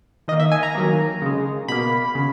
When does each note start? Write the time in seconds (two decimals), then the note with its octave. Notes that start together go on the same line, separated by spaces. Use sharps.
0.28 D#3 D#5
0.32 A#3
0.40 E5
0.52 G#5
0.63 A#5
0.75 D#3 F#3 A#3
1.22 C#3 G#3
1.68 B2 A#3 B5
2.15 C#3